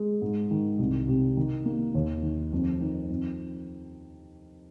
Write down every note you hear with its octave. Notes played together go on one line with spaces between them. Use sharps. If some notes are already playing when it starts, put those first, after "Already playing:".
Already playing: G#3
G#2
D#3
C2
C3
D#3
A#3
D#2
D#3
F2
D#3
F2